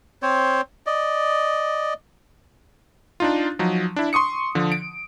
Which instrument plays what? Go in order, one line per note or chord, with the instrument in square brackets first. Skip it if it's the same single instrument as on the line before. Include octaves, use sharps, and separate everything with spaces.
[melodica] C4 C5 C#5
D5 D#5
[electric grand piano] D4 D#4 F4
F3 F#3 D#4
D4 E4
C6 C#6 D#6 C#7
D3 F3
D7